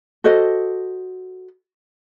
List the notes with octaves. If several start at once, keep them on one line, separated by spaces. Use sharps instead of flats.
F#4 A4 C5 D#5